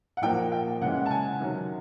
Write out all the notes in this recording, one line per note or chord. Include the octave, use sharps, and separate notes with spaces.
F#5
A#2 F3 A#3 G5
G5
C#3 E3 G#3 F#5
A5
G#5
C3 D#3 F#3